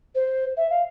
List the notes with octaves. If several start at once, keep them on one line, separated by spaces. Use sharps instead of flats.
C5
E5
F5